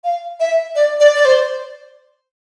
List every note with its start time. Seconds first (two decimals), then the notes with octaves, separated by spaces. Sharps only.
0.04 F5
0.40 E5
0.76 D5
1.00 D5
1.16 D5
1.25 C5